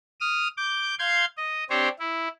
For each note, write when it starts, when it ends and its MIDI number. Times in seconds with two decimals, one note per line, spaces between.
0.21 0.48 87
0.21 0.48 89
0.57 0.95 86
0.57 0.95 91
0.99 1.25 77
0.99 1.25 84
0.99 1.25 91
0.99 1.25 92
1.37 1.64 75
1.70 1.88 60
1.70 1.88 62
1.70 1.88 67
1.70 1.88 72
1.70 1.88 73
1.99 2.28 64